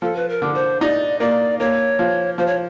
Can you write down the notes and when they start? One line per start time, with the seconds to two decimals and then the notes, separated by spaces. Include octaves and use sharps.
0.02 F3 A4
0.16 B4
0.29 A#4
0.42 D3
0.55 C5
0.81 D#4 D5
1.20 A#3 D5
1.60 A#3 C#5
1.99 F3
2.38 F3 C5
2.47 C#5